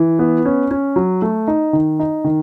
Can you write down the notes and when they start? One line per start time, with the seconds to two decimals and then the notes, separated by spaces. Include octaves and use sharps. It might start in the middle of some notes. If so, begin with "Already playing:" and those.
Already playing: E3
0.19 B3
0.45 C#4
0.71 C#4
0.96 F#3
1.22 A3
1.48 D#4
1.73 D#3
1.99 D#4
2.24 D#3